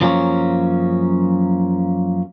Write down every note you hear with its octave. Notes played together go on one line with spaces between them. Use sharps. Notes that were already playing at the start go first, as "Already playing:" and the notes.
F#2 F3 F#3 A#3 B3 C#4